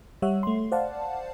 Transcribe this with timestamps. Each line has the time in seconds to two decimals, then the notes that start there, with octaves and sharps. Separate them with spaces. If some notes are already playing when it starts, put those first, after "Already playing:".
0.22 G3 C#5 E5 F#5
0.43 A3 C6
0.72 C5 D5 F5 F#5 A5